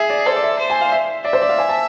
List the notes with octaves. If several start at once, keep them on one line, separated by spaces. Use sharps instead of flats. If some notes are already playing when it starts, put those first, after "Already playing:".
Already playing: G#4 E5
D5
A4 C5
D5
E5
C5
G#5
F5
E5
D5 E5
C5
D5
F5
G#5
A5